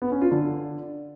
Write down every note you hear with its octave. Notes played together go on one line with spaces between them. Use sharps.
B3
C#4
F4
D3